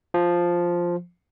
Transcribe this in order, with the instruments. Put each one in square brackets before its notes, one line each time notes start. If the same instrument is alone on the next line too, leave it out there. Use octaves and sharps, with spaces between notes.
[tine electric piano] F3